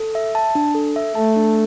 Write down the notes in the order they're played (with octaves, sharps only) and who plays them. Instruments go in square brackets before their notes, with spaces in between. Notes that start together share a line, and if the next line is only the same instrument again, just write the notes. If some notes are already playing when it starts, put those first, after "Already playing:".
Already playing: [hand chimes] A4
E5
A5
D4
A4
E5
[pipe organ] A3 [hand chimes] A5
[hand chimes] D4